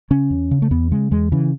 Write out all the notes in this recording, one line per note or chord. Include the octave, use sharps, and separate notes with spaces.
C#3 C#4
E2
C#3
A3
E2 B3
C#3 G#3
E2 G#3
C#3 E3